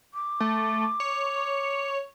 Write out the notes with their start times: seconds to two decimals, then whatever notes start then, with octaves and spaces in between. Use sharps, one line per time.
0.14 D6
0.40 A3
1.00 C#5